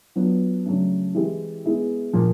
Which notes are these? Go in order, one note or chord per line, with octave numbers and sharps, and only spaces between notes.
F#3 B3 D4 F4
C#3 F#3 A3 D4
E3 G#3 C4 E4 G4
G#3 B3 E4 G#4
A#2 F3 A#3